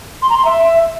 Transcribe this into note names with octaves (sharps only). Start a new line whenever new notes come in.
C6
A#5
C6
E5